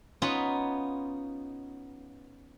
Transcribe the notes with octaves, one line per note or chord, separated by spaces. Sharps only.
B3 C#4 D#4 F4 B4